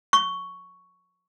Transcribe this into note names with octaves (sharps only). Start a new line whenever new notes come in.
C#6